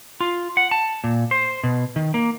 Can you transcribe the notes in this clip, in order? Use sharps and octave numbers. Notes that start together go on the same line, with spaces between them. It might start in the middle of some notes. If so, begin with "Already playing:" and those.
F4
F#5
A5
A#2
C5
B2
D#3
A#3